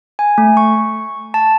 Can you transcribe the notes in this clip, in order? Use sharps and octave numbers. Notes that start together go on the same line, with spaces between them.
G#5
A3
C#6
A5